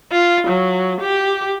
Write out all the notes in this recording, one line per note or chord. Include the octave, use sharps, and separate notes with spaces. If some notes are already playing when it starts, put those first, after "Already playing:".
F4
F#3
G4